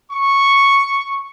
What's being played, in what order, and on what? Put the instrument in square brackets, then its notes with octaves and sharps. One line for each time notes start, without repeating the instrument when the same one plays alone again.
[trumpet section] C#6